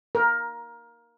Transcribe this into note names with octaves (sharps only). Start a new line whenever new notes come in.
A#4